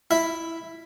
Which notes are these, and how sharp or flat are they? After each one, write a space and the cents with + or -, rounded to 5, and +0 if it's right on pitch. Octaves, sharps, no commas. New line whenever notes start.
E4 +0 E5 +0